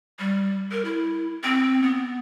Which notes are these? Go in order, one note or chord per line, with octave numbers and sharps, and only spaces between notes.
G3
A#4
E4
C4
B3